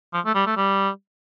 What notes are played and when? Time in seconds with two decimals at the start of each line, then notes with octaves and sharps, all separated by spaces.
0.13 F3
0.25 A3
0.35 G3
0.46 A3
0.57 G3